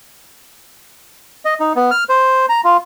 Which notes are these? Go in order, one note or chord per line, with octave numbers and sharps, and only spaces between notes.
D#5
D#4
B3
F6
C5
A#5
F4